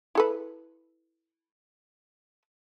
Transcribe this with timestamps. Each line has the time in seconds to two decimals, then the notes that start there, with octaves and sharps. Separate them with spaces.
0.15 E4 A4 B4